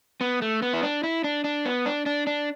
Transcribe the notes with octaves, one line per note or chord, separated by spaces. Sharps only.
B3
A3
B3
E4
D4
E4
D4
D4
B3
D4
D4
D4